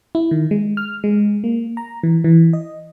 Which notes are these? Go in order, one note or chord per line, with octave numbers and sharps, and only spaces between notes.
E4
D#3
G#3
F6
G#3
A#3
A#5
E3
E3
D#5